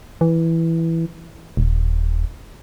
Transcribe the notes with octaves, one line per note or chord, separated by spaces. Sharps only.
E3
D#1